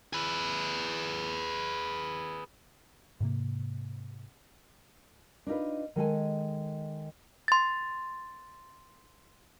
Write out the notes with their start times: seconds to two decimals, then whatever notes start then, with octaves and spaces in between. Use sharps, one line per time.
0.13 G#4 B4
3.20 G#2 C3 A#3
5.47 D4 D#4 F4 B4
5.96 D#3 G#3 A4 G#5
7.48 C6 A6